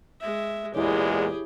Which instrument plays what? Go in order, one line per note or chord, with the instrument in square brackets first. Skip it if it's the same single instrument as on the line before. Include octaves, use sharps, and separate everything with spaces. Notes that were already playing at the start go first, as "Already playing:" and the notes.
[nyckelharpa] G#3 E5
[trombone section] E2 A#2 G#3 [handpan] E4 C#5 [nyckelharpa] G4 G#4